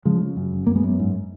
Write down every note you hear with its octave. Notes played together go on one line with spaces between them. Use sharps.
C#3 F3 G#3
C#3
F#2
F#1
F#2 A#3
G#3 B3
F#2
G#2